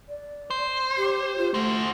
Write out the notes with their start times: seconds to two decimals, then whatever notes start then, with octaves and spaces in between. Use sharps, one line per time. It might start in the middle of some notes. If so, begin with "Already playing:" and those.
0.09 D5
0.51 C5
0.97 G4
1.38 F4
1.54 A3 F#4 C5